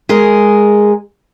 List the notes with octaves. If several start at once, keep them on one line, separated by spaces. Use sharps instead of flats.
G#3 G#4 A#4